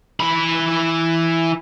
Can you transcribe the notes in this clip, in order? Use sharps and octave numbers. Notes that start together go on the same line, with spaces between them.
E3 B5